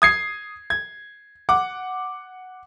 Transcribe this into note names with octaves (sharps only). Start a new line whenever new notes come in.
D#6 G#6 C7
G#6
F#5 D6